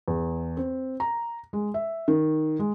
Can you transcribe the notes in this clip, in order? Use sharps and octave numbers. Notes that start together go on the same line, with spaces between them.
E2
C4
A#5
G#3
E5
D#3
G#3